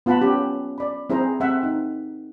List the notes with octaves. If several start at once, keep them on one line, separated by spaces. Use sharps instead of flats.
B3 F4 F#5 A5 B5
C#4 G4
D5 B5
C4 E4 G#4 C5 A#5
C4 E5 F#5
D#4